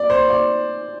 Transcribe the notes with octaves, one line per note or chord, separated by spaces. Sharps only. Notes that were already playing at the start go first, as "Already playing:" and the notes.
Already playing: D5
C5
D5